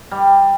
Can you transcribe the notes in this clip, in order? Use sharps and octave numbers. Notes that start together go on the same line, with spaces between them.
G3